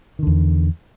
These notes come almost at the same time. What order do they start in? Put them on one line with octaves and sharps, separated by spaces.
D#3 D3 E2